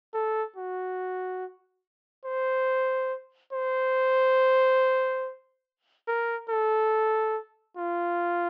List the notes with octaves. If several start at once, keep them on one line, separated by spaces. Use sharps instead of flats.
A4
F#4
C5
C5
A#4
A4
F4